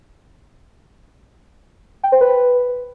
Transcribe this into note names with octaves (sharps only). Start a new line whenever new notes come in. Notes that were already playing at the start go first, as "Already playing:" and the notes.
G5
C5
B4